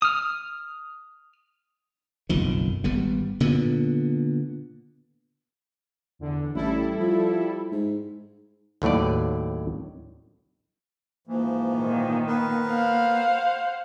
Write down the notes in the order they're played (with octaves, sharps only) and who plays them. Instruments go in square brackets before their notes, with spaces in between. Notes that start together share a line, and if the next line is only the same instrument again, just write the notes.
[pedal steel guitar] D#6 F6
[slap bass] F#1 B1 F2 D#3
G#1 G3 B3
A#2 D3 B3
[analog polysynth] E2 D3
[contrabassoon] A1 [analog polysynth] G3 E4 A4
[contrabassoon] F3
G#2
[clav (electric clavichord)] D#2 A2 F#3 B4 D5
[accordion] G#2 E3 F3 [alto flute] A#3
[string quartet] A#2 D#3
[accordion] B3 A#4 B4
[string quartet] C5 F5 F#5